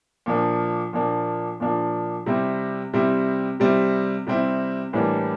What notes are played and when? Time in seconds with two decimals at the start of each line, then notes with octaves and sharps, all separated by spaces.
0.26 A#2 F3 A#3 D4
0.93 A#2 F3 A#3 D4
1.60 A#2 F3 A#3 D4
2.26 C3 G3 C4 E4
2.94 C3 G3 C4 E4
3.60 C3 G3 C4 E4
4.27 C3 G3 C4 E4
4.93 A2 E3 G3 A#3 D4